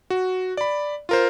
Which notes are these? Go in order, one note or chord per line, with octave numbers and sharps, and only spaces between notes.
F#4
D5 B5
F4 A#4 C5